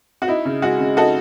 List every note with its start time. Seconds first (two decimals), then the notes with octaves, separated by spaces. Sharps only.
0.22 F#4
0.28 D#4 E4
0.45 C#3
0.62 G#3 F#4
0.80 C#3
0.97 D#4 F#4 A4